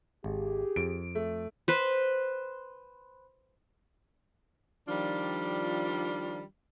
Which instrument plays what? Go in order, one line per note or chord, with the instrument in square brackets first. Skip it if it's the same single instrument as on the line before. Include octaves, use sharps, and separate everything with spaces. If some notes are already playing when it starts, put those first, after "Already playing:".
[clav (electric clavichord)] G#1 [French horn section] G4 G#4
[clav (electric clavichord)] F2 [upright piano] D7
[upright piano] A3
[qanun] B4 C5
[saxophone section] D#3 F3 G3 D4 F4